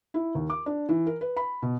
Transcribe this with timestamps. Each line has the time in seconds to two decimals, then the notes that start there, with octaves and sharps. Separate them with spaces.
0.14 E4
0.35 D#2
0.50 D6
0.66 D4
0.89 E3
1.07 A#4
1.21 B4
1.37 B5
1.62 B2